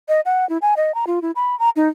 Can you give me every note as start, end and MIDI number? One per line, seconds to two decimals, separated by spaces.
0.09 0.21 75
0.25 0.48 78
0.49 0.58 64
0.62 0.74 80
0.77 0.94 75
0.95 1.05 82
1.07 1.22 65
1.22 1.31 64
1.36 1.58 83
1.59 1.70 82
1.76 1.89 63